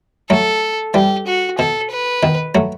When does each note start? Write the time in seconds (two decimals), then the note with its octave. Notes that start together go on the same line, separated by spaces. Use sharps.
0.30 F#3 A3 A4
0.94 E3 G3 G4
1.27 F#4
1.58 B2 A4
1.91 B4
2.23 B2 D#3
2.55 F#3 A3